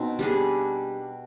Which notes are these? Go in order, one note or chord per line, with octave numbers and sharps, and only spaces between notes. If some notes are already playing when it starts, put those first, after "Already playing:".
Already playing: B2 C4 D#4
G3 D4 G#4